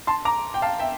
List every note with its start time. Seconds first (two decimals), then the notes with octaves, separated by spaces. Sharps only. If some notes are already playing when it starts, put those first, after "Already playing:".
0.07 A5 C6
0.25 A#5 D6
0.54 G5
0.62 F5 A5
0.79 E5 G5